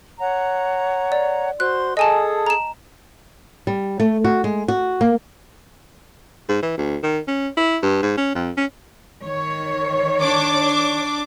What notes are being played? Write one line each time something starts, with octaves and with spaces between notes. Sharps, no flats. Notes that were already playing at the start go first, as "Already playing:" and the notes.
C#5 F#5 A#5
D5
F#4 C5 C6 F#6
G#4 A4 D#5 G#5 A5 D#6
A#5 E7
G3
A3
F#4
G#3
F#4
A#3
G#2
E3
D2
D#3
C#4
E4
G2
G#2
C#4
F2
C#4
D#3 C#5
D4 D6